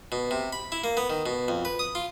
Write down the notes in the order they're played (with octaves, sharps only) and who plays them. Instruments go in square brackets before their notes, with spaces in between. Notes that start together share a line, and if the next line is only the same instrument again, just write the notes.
[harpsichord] B2
C3
B5
E4
A#3
B3
D#3
B2
F2
B4
D#6
F4